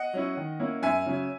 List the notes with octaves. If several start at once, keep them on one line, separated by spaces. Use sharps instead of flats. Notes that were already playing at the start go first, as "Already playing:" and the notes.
Already playing: D#5 F#5
F#3 C#4 E4
D#3
A#3 C#4 E4
F#2 E5 G#5
C#3 F#3